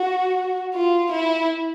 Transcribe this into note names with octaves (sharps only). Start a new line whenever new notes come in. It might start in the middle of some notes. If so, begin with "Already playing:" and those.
Already playing: F#4
F4
E4